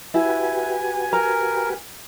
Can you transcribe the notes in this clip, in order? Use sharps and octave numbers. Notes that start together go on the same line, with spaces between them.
E4 F#4 G4 B4 G#5
A#4 A#5